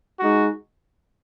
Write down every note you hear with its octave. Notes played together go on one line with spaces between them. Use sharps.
G#3 D#4 F#4